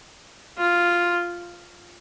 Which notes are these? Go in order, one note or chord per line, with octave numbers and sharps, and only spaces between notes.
F4